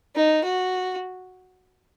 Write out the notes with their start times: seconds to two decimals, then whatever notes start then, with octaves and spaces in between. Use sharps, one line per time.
0.15 D#4
0.44 F#4